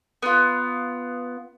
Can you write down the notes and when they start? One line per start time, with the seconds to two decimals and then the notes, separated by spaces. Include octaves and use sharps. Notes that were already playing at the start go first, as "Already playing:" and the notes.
0.22 B3 F4